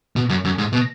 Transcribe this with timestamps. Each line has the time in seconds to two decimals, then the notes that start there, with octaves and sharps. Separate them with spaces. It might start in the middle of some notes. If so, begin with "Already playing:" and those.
0.16 B2
0.30 F#2
0.45 F#2
0.58 G#2
0.73 B2